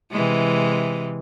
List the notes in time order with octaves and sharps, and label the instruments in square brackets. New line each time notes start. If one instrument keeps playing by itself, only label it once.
[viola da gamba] C3 E3 G#3